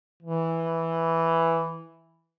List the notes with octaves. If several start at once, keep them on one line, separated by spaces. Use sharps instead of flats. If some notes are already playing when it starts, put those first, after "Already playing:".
E3